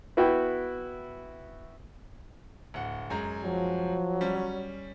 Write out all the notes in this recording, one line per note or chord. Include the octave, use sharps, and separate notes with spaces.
B3 E4 F#4 G5
D1 F#5
F#2 G#3 A#5
F3 F#3
G3 C#4